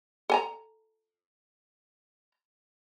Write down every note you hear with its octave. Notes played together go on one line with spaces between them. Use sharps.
A4 G#5 A#5